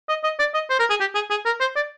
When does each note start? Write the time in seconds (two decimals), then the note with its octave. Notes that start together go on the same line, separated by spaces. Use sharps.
0.09 D#5
0.24 D#5
0.39 D5
0.54 D#5
0.70 C5
0.80 A#4
0.90 G#4
1.00 G4
1.15 G#4
1.30 G#4
1.46 A#4
1.61 C5
1.76 D5